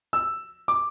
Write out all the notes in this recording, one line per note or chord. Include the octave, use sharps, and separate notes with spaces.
E6
D6